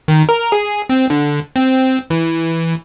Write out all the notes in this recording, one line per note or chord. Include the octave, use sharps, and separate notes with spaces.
D#3
A#4
G#4
C4
D3
C4
E3